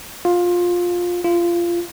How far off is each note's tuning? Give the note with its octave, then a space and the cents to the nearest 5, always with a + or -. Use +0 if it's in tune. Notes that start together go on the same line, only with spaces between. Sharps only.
F4 +15
F4 -20